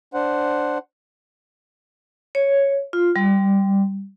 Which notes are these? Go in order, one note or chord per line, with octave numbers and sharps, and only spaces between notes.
D4 C5 F#5
C#5
F4
G3